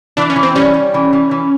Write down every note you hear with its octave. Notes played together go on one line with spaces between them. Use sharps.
E3 D4
C#4
E3
C4
G3 C#4
G3
E3
E3
E3